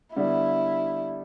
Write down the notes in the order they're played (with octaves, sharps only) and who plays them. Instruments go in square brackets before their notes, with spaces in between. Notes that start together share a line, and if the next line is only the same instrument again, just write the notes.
[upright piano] D3 G3 B3 [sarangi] E4